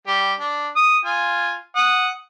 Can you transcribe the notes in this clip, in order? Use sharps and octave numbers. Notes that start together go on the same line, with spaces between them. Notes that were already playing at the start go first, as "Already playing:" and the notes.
G3 G4
D4
D#6
F4 G#5
F#5 D#6